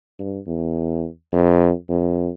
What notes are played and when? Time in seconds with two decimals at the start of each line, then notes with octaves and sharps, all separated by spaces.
0.19 G2
0.47 E2
1.33 F2
1.89 F2